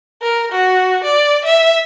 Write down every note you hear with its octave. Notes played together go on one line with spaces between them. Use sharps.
A#4
F#4
D5
E5